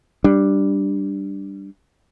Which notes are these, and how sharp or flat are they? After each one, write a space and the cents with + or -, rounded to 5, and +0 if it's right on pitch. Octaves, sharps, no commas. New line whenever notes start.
G3 +0 D4 +0